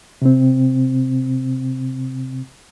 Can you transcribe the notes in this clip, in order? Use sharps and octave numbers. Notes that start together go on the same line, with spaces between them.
C3 C4